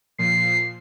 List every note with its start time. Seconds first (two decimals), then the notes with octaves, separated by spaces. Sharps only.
0.18 A#2 F3 C7